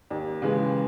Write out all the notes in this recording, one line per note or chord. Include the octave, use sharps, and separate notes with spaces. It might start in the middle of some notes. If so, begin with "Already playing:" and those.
D#2
C#3 E3 G#3